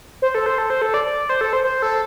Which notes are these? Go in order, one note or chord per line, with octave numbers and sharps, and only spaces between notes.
C5
A4
C5
A4
C5
A4
D5
C5
A4
C5
C5
A4